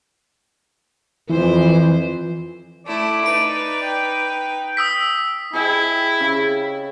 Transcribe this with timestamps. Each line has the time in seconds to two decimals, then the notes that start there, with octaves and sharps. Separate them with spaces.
1.29 F2 E3 C5
2.86 A3 E4 D5
3.26 D#4 B4 D7
3.82 G5
4.77 D#6 E6 B6
5.53 E4 G#4 D#5 G5
6.20 C#3